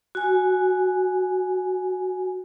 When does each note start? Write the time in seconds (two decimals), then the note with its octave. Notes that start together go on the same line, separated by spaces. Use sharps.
0.15 F#4 G#5